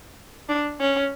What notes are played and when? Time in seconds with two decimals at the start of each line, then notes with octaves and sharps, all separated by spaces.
0.49 D4
0.80 C#4